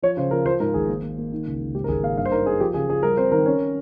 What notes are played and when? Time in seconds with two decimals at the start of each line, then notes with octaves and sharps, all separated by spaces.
0.02 F3 C#5
0.17 C#3 C5
0.31 F3 A#4
0.46 F3 C5
0.60 G#2 A#4
0.74 G#1 G#4
0.89 A#3
1.03 A#3
1.18 A#3
1.32 D#3
1.46 C#2
1.60 C#2
1.75 G#2 G4
1.84 A#4
1.88 G#1 G#4
2.03 A#3 F5
2.17 G2 F5
2.25 C5
2.31 D#4 A#4
2.46 D#4 G#4
2.60 F3 G4
2.74 C#3 G#4
2.89 F3 G#4
3.03 G3 A#4
3.17 C4 C5
3.32 D#3 A#4
3.46 C#4